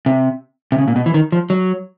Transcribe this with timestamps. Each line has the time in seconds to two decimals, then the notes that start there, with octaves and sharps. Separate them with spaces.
0.06 C3
0.72 C3
0.78 C#3
0.88 A#2
0.96 B2
1.06 E3
1.14 D#3
1.32 F3
1.50 F#3